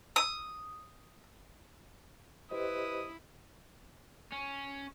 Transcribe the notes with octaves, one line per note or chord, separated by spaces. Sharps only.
D#6
E4 G4 B4 C5 D#5 D#6
C#4